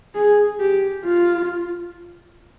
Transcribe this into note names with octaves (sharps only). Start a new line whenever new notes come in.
G#4
G4
F4